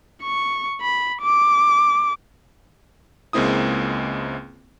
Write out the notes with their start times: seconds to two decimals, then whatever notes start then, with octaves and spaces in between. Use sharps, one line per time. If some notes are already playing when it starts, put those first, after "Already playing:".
0.23 C#6
0.81 B5
1.22 D6
3.33 C#2 G#3 A#3 C4 E4 D#6